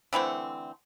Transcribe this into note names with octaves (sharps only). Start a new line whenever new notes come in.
D3 E3 A3 C4